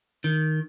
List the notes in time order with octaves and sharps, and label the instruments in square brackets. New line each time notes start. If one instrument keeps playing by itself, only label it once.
[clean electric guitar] D#3